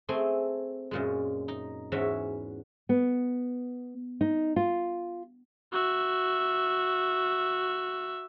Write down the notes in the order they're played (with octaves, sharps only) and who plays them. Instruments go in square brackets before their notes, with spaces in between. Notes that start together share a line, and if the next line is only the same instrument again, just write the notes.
[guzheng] A3 C4 G#4 G#5 C6
F#2 A#2 G#3
D#4
E2 G#2 C#4 F#4 E5
[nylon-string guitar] B3
D#4
F4
[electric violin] F#4 E5